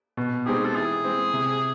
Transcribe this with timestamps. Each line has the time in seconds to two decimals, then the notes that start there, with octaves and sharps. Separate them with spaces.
0.17 B2
0.46 G#3 C4 D#4 G4 G#4
0.65 A4
0.76 E3 G#4
1.04 G#3 C4
1.34 C3